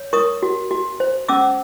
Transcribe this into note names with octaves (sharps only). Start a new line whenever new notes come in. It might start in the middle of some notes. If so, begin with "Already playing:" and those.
Already playing: C#5
A#4 C#6 D#6
F#4
F#4
C5
C#4 D6 E6